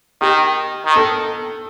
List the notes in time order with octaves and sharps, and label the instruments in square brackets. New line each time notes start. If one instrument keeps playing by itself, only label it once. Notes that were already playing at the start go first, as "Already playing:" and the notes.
[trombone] D#3 [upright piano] G4
[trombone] D#3
[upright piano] A4